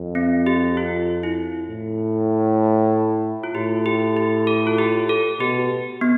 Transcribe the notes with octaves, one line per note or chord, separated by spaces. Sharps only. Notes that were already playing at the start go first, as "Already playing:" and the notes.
Already playing: F2
C4
G4
F4
E4
A2
F4
A2 G4
G4
G4
A4
F4
G4
A4
B2 G4
B3